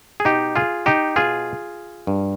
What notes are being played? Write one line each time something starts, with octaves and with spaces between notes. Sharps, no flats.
G#4
B2 D#4 G4
F4 G#4
D#4 G4
B2 F4 G#4
G2